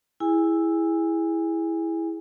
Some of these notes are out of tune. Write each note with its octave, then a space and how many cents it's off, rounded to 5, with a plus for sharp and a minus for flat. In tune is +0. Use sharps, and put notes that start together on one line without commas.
E4 +0 G#4 +0 G#5 -25